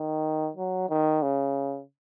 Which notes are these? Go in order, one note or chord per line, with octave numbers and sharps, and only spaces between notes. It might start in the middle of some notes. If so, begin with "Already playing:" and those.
Already playing: D#3
F#3
D#3
C#3